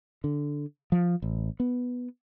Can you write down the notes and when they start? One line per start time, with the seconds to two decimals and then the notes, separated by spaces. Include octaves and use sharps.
0.24 D3
0.92 F3
1.22 A1
1.60 B3